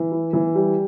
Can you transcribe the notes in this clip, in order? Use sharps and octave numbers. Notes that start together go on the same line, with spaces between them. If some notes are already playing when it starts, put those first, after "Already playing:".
Already playing: E3
E4
E3
G3